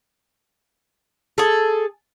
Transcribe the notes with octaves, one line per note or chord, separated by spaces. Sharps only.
G#4 A4